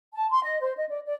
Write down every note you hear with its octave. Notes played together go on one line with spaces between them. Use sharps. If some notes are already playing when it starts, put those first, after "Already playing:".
A5
C6
D#5
C5
D#5
D5
D5